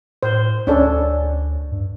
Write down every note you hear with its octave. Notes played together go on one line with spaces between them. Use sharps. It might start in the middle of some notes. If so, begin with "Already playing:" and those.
A2 C5
D2 C#4 D4 A4
G2